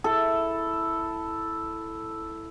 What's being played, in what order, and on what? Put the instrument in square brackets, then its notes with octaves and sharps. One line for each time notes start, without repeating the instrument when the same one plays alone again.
[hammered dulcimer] E4 A4